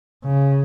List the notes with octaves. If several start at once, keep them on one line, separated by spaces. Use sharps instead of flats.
C#3